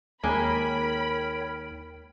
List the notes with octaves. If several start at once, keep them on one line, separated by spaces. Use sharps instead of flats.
D#2 G#3 A#3 A#4 C#5 G5 B5